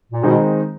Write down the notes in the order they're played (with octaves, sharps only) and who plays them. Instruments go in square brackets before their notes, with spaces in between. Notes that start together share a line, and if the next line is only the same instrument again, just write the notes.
[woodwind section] A#2
[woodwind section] B2 [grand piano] D#3 G#3 C4 D#4